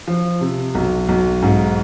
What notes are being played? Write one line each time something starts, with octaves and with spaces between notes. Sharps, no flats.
F3
C3
B1
B1
G#2